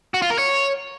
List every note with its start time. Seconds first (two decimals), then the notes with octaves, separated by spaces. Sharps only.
0.14 F#4
0.22 F4
0.30 A#4
0.38 C#5